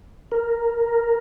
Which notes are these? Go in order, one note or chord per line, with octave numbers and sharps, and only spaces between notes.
A#4